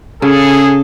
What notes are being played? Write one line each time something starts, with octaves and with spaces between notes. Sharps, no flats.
C#3 G#4 A4